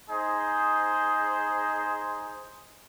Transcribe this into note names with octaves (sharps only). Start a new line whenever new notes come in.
D#4 G#4 C5